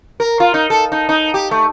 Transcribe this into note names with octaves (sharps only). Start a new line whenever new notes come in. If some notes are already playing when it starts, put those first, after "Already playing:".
A#4
F4
D#4
A4
D#4
D#4
G4
A3